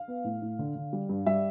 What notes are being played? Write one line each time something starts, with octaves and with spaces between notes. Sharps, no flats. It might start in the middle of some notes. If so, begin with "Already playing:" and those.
Already playing: F5
B3
A2
A2
D3
D3
G3
G2
G3 E5